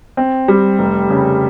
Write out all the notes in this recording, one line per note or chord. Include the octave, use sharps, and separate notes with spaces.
C4
G3
F1
C#3